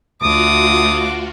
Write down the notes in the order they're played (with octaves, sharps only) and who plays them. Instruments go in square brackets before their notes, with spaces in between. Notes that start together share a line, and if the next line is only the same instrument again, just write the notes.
[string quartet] D2 [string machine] F4 F#4 [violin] D6 [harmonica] D#6